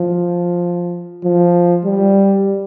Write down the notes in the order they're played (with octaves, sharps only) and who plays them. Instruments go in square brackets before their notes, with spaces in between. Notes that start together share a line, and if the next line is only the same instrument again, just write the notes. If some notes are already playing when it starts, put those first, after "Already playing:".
Already playing: [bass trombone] F3
F3
G3